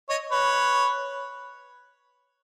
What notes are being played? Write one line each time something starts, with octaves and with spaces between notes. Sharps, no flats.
C#5 D#5
B4 C#5